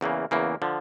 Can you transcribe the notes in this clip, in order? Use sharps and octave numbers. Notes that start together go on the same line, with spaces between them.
E2 C#3 E3 A#3
E2 C#3 E3 A#3
D3 F3